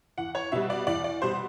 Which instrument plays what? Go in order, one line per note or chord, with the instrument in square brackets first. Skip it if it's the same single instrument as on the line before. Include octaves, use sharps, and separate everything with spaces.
[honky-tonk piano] E2 F#5
C#5
B2 G3 E5
D5
E2 D5
D5
B2 G3 C5